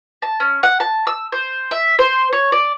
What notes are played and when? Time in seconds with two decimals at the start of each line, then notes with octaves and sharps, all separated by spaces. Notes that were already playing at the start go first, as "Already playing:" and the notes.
0.22 A5
0.40 C#4
0.63 F#5
0.80 A5
1.07 E6
1.32 C5
1.71 E5
1.99 C5
2.33 C#5
2.52 D5